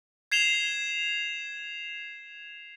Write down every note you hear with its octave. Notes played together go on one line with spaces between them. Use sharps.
G#6 C7 E7 F7 G7